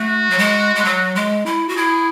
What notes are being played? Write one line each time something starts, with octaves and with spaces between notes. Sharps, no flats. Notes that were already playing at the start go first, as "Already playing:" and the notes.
Already playing: A3 F#4
F#3
G#3
G#3
F#3
G#3
E4
F#4
E4 G#4